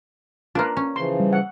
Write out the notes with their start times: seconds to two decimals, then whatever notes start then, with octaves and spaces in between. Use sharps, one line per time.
0.55 A#3 D4 F4 A#4 B4
0.77 C#4
0.96 C#3 E3 F3 C6
1.20 G3
1.33 F#5